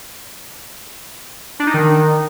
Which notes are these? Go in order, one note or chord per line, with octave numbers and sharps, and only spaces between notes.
D4
D#4
D#3